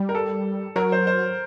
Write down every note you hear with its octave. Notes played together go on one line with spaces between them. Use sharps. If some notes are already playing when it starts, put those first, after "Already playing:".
Already playing: G3
A#4
A4
F#3 A#4
C5
C5